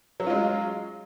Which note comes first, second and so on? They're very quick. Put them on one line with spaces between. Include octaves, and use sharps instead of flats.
F#3 C#4 F4 G#3